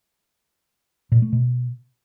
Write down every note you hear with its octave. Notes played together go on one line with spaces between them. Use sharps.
A#2
A3
B2